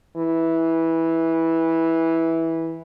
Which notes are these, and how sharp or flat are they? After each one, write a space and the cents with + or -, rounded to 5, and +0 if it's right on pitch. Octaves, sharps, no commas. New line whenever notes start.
E3 -10